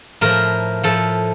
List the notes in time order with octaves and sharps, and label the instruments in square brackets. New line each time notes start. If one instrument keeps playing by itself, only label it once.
[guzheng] A2 F3 A#4
A2 F3 A4